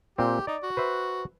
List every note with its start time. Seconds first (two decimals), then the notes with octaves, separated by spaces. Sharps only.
0.18 A#2 C4 G4
0.47 D#4 D5
0.63 F#4
0.77 B4 C5 E5